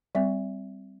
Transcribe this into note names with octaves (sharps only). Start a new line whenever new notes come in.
G3 C4 E5